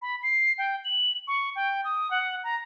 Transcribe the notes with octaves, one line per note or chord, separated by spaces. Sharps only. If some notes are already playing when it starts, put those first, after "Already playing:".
B5
C7
G5
F#7
C#6
G5
D#6
F#5
A#5